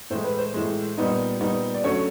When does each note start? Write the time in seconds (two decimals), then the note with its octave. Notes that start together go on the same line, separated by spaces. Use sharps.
0.10 A2 E3 G#3 C5
0.24 B4
0.38 C5
0.54 A2 E3 G#3
0.98 A#2 G3 B3 D#4
1.41 A#2 G3 B3 D#4
1.74 D5
1.84 D3 F#3 A3 C#4 C#5